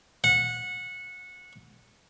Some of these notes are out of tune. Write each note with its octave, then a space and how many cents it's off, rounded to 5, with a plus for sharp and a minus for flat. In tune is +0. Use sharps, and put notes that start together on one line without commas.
F#5 -20